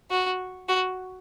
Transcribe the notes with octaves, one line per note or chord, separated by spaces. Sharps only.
F#4
F#4